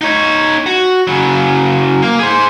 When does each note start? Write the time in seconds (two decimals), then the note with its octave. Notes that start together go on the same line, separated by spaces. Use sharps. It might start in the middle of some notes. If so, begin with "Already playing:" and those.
0.01 D#4 C#5
0.66 F#4
1.07 C#3 F#3
2.02 A#3
2.19 G#4 C5